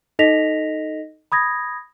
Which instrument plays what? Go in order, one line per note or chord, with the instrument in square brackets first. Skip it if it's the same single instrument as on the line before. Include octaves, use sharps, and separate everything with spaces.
[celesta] D#4 A4 D#5 A#6 B6 F7
B5 D#6 G#6 A#6